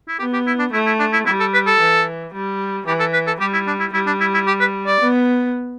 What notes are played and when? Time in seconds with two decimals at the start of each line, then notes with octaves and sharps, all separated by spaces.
0.08 E4
0.19 B3 G4
0.33 G4
0.47 E4
0.59 D4
0.73 A3 E4
0.86 E4
1.00 D4
1.13 E4
1.26 G3 E4
1.40 A4
1.54 B4
1.67 A4
1.80 E3
2.34 G3
2.87 E3 G4
3.00 A4
3.13 B4
3.27 A4
3.40 G3 G4
3.53 E4
3.67 D4
3.80 E4
3.93 G3 E4
4.07 D4
4.20 E4
4.34 E4
4.47 G4
4.60 B4
4.87 D5
5.00 B3